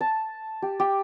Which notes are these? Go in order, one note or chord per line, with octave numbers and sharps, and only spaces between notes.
A5
G4
G4